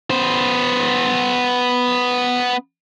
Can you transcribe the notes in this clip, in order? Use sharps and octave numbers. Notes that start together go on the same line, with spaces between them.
B3 C5